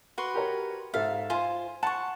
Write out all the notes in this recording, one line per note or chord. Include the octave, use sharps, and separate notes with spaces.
F#4 B4 C6
G4 A#4 C#5
G#2 A4 E5 F5
F4 C5 G#5 C6
F#5 A5 C6 C#6